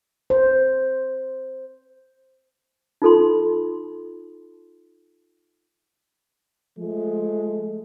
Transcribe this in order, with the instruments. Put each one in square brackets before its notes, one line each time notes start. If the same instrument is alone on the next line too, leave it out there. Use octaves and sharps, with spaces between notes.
[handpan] C5
[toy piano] D#4 F4 A4 A5 C6
[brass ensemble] F3 G#3 A3